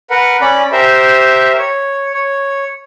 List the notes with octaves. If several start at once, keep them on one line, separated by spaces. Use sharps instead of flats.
A#4 B4 F#5
C#4 D5 B5
G4 A#4 C5 E5
C#5
C#5